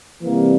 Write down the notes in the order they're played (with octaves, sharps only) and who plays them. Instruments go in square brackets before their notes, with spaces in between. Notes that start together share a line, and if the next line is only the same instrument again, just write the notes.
[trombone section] C3 E3 G3 A#3